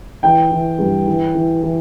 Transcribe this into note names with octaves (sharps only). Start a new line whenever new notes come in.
E3 G5
E3
G2
E3
E3
E3